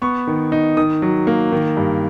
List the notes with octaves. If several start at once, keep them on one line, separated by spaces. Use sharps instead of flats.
B3 C#6
D#3
D#4
D#3 D#6
F#3
A#3
D#3
G2